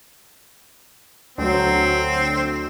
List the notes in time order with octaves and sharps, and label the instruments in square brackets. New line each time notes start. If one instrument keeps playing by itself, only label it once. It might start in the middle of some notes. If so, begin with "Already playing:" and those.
[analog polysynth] D2 [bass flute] F#3 [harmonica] C4